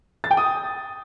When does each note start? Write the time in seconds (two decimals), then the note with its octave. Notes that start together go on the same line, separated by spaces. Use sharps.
0.24 A6
0.31 G5
0.37 D#6